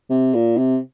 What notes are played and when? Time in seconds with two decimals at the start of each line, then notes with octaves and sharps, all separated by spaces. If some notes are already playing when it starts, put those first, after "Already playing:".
0.10 C3
0.34 A#2
0.57 C3